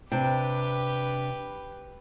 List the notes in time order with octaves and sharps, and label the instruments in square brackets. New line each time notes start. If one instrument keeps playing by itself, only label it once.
[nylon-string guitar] C3 D4 G5 [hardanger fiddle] G4 B4